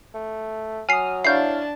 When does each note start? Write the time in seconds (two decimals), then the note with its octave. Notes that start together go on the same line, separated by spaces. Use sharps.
0.14 A3
0.89 F#3 G#5 D#6 F6 C7
1.25 D4 E4 C#5 F5 A5 G6 C7